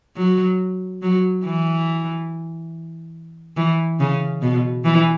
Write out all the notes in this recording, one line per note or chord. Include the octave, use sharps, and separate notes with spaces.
F#3
F#3
E3
E3
C#3
B2
E3